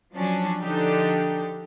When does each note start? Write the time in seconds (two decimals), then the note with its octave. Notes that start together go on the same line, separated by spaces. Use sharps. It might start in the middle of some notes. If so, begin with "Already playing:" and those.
0.13 F3 F#3 C#4 D4
0.60 D3 F3 D4 D#4 G4 A4